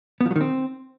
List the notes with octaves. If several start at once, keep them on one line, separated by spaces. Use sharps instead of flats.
B3
F3
F#3
D#3
C4